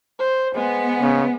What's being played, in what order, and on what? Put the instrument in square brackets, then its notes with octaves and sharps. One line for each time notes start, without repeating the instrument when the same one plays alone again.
[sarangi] C5
[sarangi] G#3 [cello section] B3
[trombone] C#3